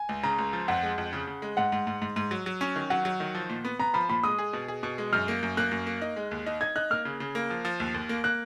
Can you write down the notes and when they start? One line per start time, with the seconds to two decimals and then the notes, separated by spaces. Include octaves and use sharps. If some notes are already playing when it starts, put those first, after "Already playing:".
Already playing: G#5
0.09 C#2
0.23 C#3 A#5
0.38 C#2
0.53 F3
0.68 F2 F#5
0.83 G#3
0.98 F2
1.13 C#3
1.27 C#3
1.42 G#3
1.57 G#2 F#5
1.72 G#2
1.87 G#2
2.02 G#2
2.16 G#2
2.31 F#3
2.46 F#3
2.61 C#4
2.76 D#3
2.90 F#3 F#5
3.05 F#3
3.20 D#3
3.35 F3
3.50 A#2
3.65 B3
3.79 B3 A#5
3.94 F3 B5
4.09 A#2 B5
4.23 G#3 D#6
4.39 G#4
4.53 B2
4.68 G#4
4.83 B2
4.98 G#3
5.13 F#2 F6
5.28 A#3
5.43 F#2
5.57 A#3 F#6
5.71 F#2
5.87 A#3
6.02 D#4
6.16 G#3
6.31 D#2
6.46 D#4
6.61 D#4 G#6
6.76 D#4 F#6
6.90 A#3 F6
7.05 C#3
7.20 C#3
7.35 A#3
7.50 F3
7.65 F3
7.80 D#2
7.94 D#2
8.09 A#3
8.24 A#3 F#6